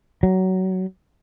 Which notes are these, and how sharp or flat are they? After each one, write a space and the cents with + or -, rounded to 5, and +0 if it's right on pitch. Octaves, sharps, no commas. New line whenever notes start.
F#3 +20